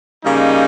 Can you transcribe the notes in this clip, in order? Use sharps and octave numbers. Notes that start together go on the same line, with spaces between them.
C#3 G3 A#3 D#4